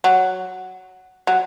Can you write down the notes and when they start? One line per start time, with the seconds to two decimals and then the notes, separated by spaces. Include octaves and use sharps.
0.04 F#3
1.27 F#3